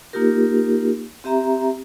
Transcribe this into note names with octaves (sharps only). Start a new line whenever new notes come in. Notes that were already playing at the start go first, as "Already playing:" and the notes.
A#3 D#4 F4 G4 A#4
C4 G4 E5 A#5